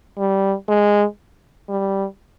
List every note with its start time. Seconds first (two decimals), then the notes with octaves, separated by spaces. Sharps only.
0.18 G3
0.69 G#3
1.69 G3